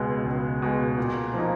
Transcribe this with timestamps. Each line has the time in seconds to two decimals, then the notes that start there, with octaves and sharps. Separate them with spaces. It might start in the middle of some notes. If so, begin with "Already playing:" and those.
Already playing: C#2 B2 G#3
0.25 C#2
0.62 B2 G#3
0.98 A#2
1.34 F3 A#3 D#4